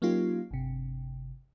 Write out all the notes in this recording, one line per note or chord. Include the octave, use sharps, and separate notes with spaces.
F#3 A#3 C#4 D#4 F4 G4
G1 C3